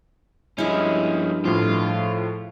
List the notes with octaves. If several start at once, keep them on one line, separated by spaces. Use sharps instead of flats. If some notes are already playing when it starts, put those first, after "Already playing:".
G2 F3 G#3 C#4 E4
A2 F3 F4